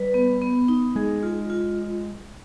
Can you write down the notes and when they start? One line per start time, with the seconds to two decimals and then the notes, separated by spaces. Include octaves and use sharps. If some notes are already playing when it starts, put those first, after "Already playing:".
Already playing: G3 B4
0.14 B3
0.42 B3
0.68 D#4
0.95 G#3 G#4
1.23 F4
1.50 F4